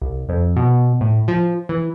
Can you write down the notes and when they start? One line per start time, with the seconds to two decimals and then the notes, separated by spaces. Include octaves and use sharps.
0.01 C2
0.29 F2
0.56 B2
1.01 A2
1.28 F3
1.69 E3